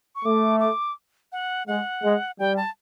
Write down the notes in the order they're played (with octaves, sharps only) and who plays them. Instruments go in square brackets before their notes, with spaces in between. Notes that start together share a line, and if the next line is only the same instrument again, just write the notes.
[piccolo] C#6
[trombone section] A3 [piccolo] D6
[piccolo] D6
F#5
[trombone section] G#3 [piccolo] F#5
[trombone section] G#3
[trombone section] G3 [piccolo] G5
[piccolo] A5